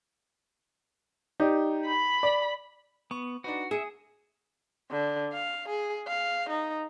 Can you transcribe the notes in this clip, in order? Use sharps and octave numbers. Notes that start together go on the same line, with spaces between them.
D#4 G4 D5
B5
D5
B3 C#6
D4 D#4 F#4 B4
G#4 E5 D#6 C#7 D#7
D3
F5
G#4
F5
D#4